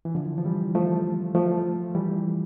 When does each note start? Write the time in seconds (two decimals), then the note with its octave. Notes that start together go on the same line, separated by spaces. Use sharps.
0.05 E3
0.15 D3 F3
0.38 F3
0.45 E3 G3
0.75 F3 A3
1.35 F3 A3
1.95 E3 G3